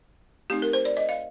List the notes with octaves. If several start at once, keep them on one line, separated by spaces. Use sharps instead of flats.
A3 C4 D#4 G4
A#4
C5
D5
D#5
F5